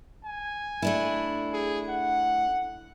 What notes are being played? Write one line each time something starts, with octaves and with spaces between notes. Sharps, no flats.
G#5
A3 D4 E4
G#4
F#5